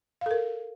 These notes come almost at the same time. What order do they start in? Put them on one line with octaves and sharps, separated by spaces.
F5 A4 A#4